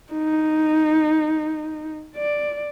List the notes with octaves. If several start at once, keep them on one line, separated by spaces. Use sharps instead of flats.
D#4
D5